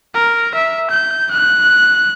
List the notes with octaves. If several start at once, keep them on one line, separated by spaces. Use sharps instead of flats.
A#4
E5
G6
F#6